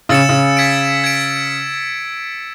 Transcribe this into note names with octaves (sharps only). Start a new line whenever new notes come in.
C#3 E6 A6 C#7 E7
C#3
G#6 B6 D7
G#6 B6 D7